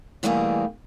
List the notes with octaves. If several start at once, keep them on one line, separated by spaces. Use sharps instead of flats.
B2 E3 G3 A3 A#3 G#4